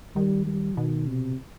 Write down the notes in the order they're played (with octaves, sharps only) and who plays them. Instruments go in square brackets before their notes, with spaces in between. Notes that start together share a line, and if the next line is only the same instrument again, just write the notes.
[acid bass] D#3 [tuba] G3
[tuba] G3
[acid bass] B2 [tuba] D#3
[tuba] C3